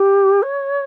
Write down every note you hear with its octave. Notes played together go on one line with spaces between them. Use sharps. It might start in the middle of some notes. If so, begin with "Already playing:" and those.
Already playing: G4
C#5